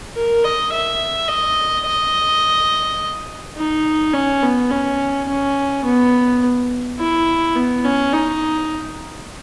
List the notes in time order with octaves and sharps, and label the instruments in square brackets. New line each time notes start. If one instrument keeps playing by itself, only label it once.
[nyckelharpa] A#4
D#5
E5
D#5
D#5
D#4
C#4
B3
C#4
C#4
B3
E4
B3
C#4
D#4